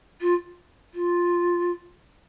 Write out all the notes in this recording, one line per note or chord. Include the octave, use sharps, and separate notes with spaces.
F4
F4